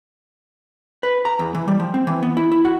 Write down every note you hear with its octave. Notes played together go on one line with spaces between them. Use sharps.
B4
A#5
E2
E3
G3
F3
C4
E3
B3
E4
E4
F#4